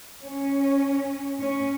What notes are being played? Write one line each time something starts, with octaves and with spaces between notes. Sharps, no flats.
C#4
C#4